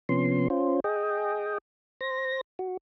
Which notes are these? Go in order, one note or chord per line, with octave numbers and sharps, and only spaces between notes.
C3 F3 B3 C#4 C6
C#4 F4 C5
G#4 D#5 G5
C5 A#6
F#4